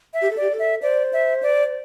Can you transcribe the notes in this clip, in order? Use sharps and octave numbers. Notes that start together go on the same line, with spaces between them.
E5
G4
A4
G4 D5
A4
E5
C5 D5
E5
D5